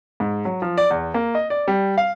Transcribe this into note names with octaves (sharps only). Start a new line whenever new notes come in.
G#2
F#3
F3
D5
E2
A#3
D#5
D5
G3
F5